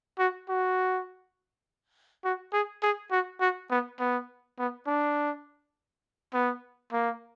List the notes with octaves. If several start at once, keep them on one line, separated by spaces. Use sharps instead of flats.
F#4
F#4
F#4
G#4
G#4
F#4
F#4
B3
B3
B3
D4
B3
A#3